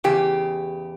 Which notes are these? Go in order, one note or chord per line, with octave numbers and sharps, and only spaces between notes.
E2 C#3 G4